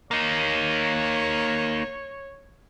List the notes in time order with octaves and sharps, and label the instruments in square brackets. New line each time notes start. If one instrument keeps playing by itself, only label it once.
[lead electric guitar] A#3 D#4 [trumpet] C#5